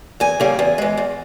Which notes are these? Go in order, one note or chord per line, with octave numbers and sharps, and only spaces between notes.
E2 G#5
C#3 G3 A#3
E2
E3 G#3
E2